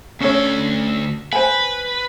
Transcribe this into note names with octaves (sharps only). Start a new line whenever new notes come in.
D2 C#4 A4 C#5
B4 C5 G#5